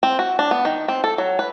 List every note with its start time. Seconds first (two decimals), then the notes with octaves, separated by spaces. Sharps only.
0.03 C4
0.19 F#4
0.39 D4
0.51 B3
0.65 D#3
0.88 C4
1.04 A4
1.18 F#3
1.39 B4